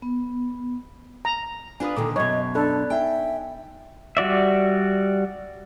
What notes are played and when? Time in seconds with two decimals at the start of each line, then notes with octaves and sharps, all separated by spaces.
0.02 B3
1.25 A#5
1.80 D4 F4 B4 G#5 D#6
1.96 A#2 D3 D#3 A4 D6
2.16 F#2 B2 C#5 D#5
2.55 D4 A4 D5 B5 F#6
2.90 D#4 E5 G5 G#5
4.17 G3 F#4 D5 E5